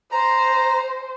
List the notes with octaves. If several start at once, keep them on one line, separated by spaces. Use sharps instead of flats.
C5 A#5